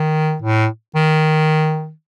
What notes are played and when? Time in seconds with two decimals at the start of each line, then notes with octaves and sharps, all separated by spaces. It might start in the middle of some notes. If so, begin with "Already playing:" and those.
Already playing: D#3
0.42 A2
0.95 D#3